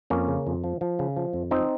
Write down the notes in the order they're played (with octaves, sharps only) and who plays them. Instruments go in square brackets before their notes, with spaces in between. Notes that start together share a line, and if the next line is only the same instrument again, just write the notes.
[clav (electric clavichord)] F2 A#3 C#4
C#3
F2
F3
F3
C#3
F3
F2
F3 C4 D#4